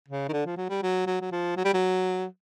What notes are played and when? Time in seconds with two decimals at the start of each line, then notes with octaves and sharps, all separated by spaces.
0.08 C#3
0.29 D#3
0.33 D3
0.46 F3
0.57 F#3
0.69 G3
0.83 F#3
1.07 F#3
1.21 F#3
1.32 F3
1.57 F#3
1.65 G3
1.74 F#3